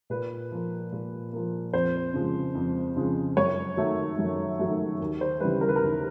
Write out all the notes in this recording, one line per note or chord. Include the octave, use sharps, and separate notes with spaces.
A#2 B4
F3 A#3
A#2
F3 A#3
F2 C5
C#3 F3 G#3
F2
C#3 F3 G#3
F#2 C#5
D#3 F#3 A3
F#2
D#3 F#3 A3
D#2
C5
C#3 E3 G3 B4
A#4
B4
A#4
D#2